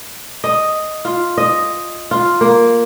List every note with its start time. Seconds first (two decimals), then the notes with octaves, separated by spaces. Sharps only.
0.44 D#5
1.05 F4
1.38 D#5
2.11 F4
2.41 A#3